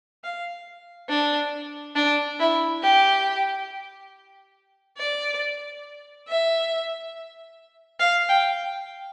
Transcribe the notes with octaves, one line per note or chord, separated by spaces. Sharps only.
F5
D4
D4
E4
G4
D5
E5
F5
G5